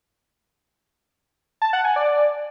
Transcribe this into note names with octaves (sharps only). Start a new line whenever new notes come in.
A5
F#5
G#5
D5